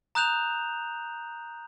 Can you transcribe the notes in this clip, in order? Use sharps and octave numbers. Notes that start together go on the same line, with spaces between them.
A#5 D#6 F#6 G6 E7 F7